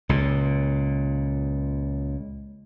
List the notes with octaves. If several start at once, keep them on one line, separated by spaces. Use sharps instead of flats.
C#2 A#2